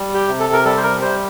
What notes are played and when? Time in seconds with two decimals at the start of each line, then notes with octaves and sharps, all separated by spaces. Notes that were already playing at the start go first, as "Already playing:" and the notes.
Already playing: G3
0.14 G4
0.28 C3
0.40 A4
0.53 A#4
0.65 G3 A4
0.77 C5
0.83 A#4
1.02 G3 C5